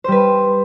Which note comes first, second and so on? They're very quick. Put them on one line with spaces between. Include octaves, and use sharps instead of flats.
C5 G3 B4